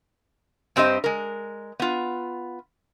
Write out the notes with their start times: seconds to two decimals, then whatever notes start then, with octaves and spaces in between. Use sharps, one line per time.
0.76 G2 C4 G4 C5 D#5
1.04 G#3 A#4
1.80 B3 F4